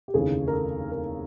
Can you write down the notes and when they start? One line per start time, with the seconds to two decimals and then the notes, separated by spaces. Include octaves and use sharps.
0.08 G4
0.14 F1 D#2 C#3 E3 G#4
0.48 A#4
0.53 A4
0.92 A#4